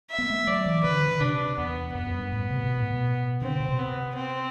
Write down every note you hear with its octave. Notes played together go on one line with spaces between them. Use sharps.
E5
B3
A3
F#3 D5
E3
D3 B4
D3
C3 D4
E2 B3
F#2 B3
F#2
G2
A2
C3
B2
A2
B2
D3 C4
C3
B2
C3
B3
C4